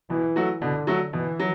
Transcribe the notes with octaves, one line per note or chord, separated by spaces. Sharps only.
B2 E3
F#3 A3 F#4
B2 D3
F#3 A3 F#4
B2 E3
F#3